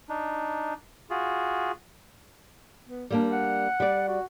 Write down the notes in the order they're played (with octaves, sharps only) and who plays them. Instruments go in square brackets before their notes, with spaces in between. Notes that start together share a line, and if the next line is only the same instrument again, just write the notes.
[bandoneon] D4 D#4
F4 F#4 G#4
[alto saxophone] B3
[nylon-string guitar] G3 A#3 D4 [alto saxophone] A#4
[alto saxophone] F#5
[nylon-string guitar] G3 D5
[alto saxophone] F#4